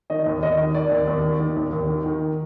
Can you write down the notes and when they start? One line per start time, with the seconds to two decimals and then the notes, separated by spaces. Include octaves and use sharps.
0.10 D#3 D#5
0.26 D#2
0.43 D#2 D#5
0.58 D#3
0.75 D#3 D5
0.91 D#2
1.08 D#2
1.24 D#3
1.40 D#3
1.57 D#2
1.73 D#2
1.89 D#3
2.06 D#3